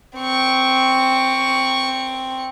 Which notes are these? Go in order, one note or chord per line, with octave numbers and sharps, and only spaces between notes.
C4 C#6